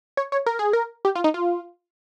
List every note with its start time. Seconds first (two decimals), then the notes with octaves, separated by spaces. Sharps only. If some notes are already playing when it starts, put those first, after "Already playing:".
0.17 C#5
0.32 C#5
0.46 A#4
0.59 G#4
0.73 A#4
1.05 G4
1.15 F4
1.24 D#4
1.34 F4